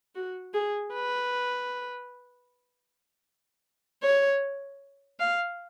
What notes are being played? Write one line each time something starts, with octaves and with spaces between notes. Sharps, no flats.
F#4
G#4
B4
C#5
F5